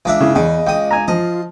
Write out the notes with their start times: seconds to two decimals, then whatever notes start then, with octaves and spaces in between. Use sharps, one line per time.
0.05 C#2 D4 E5
0.20 C#3 E4
0.35 E2 C#3 D#5
0.67 C#2 G5 D#6
0.91 G#5 A#5
1.08 F3 F4 D#5